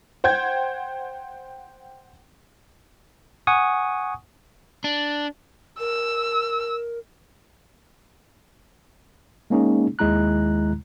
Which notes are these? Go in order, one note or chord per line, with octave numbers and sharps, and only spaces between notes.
C5 F#5 G5 G6 G#6
F#5 G#5 C#6 D#6
D4
A#4 E6
G#3 A#3 C#4 D#4 G#4
D#2 D#3 G#3 E4 A#5 F#6